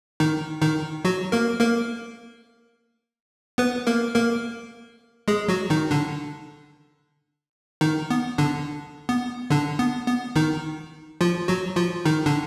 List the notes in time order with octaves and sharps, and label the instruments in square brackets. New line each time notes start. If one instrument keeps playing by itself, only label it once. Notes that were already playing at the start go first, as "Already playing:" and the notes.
[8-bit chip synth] D#3 D#4
D#3 D#4
F#3 F#4
A#3 A#4
A#3 A#4
B3 B4
A#3 A#4
A#3 A#4
G#3 G#4
F#3 F#4
D#3 D#4
D3 D4
D#3 D#4
B3
D3 D4
B3
D3 D4
B3
B3
D#3 D#4
F3 F4
F#3 F#4
F3 F4
D#3 D#4
D3 D4